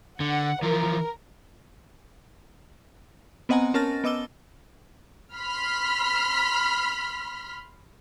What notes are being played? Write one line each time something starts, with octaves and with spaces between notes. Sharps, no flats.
D3 F#5
E3 F3 A#4
B3 C4 D#5 F#5 G#5 A#5
C#4 A#4 A5 F6 A6 A#6
B3 D#5 D6 E6 G7
B5 C6 F6 B6